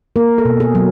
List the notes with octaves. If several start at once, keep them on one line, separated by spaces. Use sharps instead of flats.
A#3 A#4
A4
B2
G#4
F#3